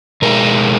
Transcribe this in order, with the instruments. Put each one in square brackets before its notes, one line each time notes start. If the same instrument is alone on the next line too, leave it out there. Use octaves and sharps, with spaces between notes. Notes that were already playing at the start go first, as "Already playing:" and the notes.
[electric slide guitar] B2 G#3 D#4 A#4